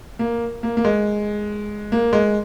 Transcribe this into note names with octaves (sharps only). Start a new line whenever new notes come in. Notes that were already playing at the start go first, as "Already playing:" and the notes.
A#3
A#3
A#3
G#3
A#3
G#3